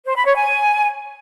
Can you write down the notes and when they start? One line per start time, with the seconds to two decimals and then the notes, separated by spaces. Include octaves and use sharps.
0.05 C5
0.15 B5
0.25 C#5
0.34 G#5